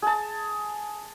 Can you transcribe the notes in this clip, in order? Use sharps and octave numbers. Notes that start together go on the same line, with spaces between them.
G#4 A5